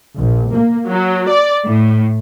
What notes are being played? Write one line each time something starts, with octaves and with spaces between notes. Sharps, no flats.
A#1
A#3
F#3
D5
A2